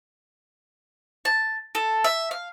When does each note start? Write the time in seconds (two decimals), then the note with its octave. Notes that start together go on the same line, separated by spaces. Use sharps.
1.25 A5
1.75 A4
2.04 E5
2.31 F5